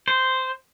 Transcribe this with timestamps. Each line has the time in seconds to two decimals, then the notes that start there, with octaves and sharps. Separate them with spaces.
0.08 C5